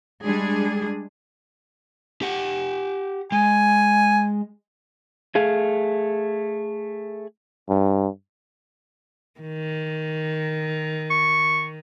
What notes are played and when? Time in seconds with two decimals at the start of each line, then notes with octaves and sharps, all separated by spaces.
0.24 G3 G#3 D4 G#4
2.22 G4 F#5
3.32 G#3 G#5
5.35 A3 G#4 F5
7.69 G2
9.41 D#3
11.10 C#6